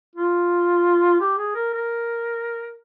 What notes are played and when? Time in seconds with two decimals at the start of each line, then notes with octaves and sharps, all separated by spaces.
0.15 F4
1.20 G4
1.38 G#4
1.55 A#4
1.74 A#4